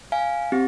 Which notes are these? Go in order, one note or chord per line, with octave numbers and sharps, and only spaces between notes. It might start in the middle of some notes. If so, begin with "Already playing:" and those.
F5 G#5
C4 G4